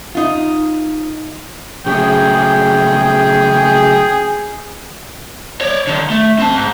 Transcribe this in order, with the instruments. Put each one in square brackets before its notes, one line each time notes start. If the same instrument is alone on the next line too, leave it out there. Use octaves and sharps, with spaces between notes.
[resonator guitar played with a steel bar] D#4 F4
[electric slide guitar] C#3 F#3 A3 [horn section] G#4 [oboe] G5
[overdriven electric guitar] C#5 D5
D3 D#3
A3
C4 A5
G#2